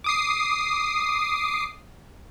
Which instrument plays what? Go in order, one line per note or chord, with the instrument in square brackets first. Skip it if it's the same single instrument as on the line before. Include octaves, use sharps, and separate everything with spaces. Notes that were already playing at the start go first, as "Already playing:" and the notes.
[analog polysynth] D6 D#6 C7